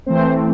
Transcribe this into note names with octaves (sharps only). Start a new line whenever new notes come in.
E3 A3 C4 C5